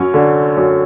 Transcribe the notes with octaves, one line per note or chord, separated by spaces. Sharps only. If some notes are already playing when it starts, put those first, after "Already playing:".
Already playing: F#2 C#4 C#5
D3
F#2